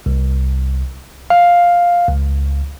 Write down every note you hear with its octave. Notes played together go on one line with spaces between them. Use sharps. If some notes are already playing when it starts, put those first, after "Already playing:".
C2
F5
C#2